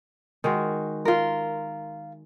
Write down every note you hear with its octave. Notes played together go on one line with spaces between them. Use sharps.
D#3 G#3 F#4
F4 A#4